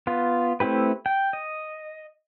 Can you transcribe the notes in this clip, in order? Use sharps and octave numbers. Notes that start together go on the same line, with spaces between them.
B3 F4
A3 C4 E4 G4 B4
G5
D#5